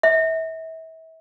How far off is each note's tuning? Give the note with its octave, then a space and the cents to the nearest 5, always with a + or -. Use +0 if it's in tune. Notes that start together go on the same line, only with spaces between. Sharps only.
E5 -35